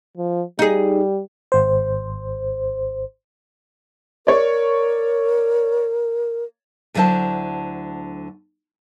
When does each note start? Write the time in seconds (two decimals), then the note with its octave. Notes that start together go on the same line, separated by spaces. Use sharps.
0.17 F3
0.59 G3 D#4 G#4
1.52 G#1 C5
4.27 A#4 C#5 D5
6.94 D2 D3 F#3 E4 C5 A5